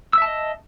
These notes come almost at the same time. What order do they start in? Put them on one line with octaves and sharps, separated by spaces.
E6 E5 A5 D#5